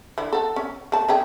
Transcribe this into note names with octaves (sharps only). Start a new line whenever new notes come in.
D3 E4
A4 F#5
C#4
A3 A5
D3 G#4 G5